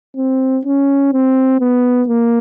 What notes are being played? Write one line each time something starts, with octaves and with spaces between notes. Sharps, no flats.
C4
C#4
C4
B3
A#3